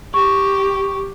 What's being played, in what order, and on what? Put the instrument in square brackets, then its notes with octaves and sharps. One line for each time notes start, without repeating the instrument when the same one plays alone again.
[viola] G4 [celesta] C#6